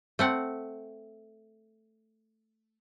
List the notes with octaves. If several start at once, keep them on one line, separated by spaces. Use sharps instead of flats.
A3 C4 F#5